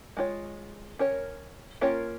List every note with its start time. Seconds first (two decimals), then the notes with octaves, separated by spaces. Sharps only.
0.17 G#3 F4 C#5
0.99 C#4 A#4 C#5
1.81 A#3 C#4 F4 A#4 C#5